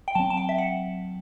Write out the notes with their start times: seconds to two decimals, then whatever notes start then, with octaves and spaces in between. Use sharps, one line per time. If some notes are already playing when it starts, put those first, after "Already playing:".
0.08 G5
0.15 F#3 C4 A5
0.30 A5
0.37 G5
0.49 E5
0.58 F#5